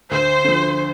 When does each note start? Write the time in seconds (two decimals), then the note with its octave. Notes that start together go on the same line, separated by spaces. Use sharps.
0.11 D2 C5
0.45 D3 F3